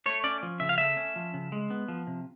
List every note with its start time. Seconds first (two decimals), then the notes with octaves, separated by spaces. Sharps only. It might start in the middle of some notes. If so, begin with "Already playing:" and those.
0.06 A3 C#5
0.24 C#4 D5
0.43 F3
0.60 C#3 E5
0.69 F5
0.78 A3 E5
0.97 C#4
1.16 F3
1.34 C#3
1.52 G#3
1.70 B3
1.88 F3
2.07 C3